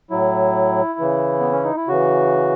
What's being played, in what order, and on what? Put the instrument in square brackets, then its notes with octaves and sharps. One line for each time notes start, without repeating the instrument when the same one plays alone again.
[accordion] A2 F#3 E4
C#3 E3
B3
C#4
D#4
E4
C#3 E3 F#4